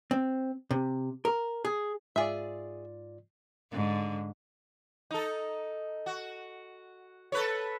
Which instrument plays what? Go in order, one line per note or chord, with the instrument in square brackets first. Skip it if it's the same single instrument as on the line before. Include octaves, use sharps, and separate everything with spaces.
[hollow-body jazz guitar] C4
C3
A#4
G#4
[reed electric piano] G#2 F4 D5 [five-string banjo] G#4 E5
[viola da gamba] G#2 D3
[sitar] D#4 A4
F#4
A4 B4 C#5